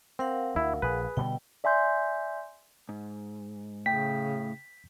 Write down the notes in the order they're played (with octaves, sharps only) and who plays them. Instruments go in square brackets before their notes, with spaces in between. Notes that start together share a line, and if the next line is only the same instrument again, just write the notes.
[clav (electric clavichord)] C4 [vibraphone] A#4 F5 F#5
[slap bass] D2 [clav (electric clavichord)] E4
[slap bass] A#1 [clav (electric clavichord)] G#4 B4
[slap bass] B2 D3 G3 [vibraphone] G5
[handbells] D5 E5 G#5 C6 G6
[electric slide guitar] G#2
[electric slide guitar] A2 [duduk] C#3 [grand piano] G5 [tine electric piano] B6